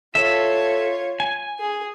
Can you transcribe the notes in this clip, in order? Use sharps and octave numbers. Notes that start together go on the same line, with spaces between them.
F4 A4 C#5 E5
G#5
G#4